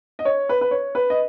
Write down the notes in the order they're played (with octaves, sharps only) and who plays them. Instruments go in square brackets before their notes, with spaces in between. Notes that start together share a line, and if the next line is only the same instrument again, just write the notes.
[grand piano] D#5
C#5
B4
B4
C#5
B4
D#5